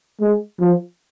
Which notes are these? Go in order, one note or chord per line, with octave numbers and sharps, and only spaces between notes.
G#3
F3